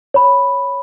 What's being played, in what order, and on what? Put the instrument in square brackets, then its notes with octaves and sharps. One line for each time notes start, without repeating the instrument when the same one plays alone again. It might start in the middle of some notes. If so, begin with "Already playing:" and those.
[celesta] C#5 B5